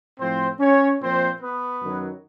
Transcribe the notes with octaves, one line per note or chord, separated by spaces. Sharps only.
A2 F3 C4 C5
C#4 C#5
A#2 F3 C4 C5
B3 B4
F#2 D#3 F#3